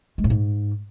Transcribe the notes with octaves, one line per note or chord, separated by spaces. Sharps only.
G#3
A2
G#2